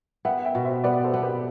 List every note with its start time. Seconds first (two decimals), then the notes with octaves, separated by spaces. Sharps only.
0.25 B3 E5 G5
0.45 E5 G5
0.55 B2
0.64 C5 E5
0.84 B3 B4 D5
1.04 A4 C5
1.14 B3
1.23 G4 B4